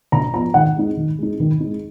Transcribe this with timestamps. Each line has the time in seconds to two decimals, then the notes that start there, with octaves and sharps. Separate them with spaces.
0.12 D3 A#5
0.34 F3 B3 A#5
0.54 D#3 F#5
0.76 G#3 D#4
0.97 D#3
1.19 G#3 D#4
1.40 D#3
1.60 G#3 D#4